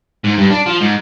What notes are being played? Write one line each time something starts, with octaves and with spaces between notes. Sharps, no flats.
G#2
G2
D4
F3
G#2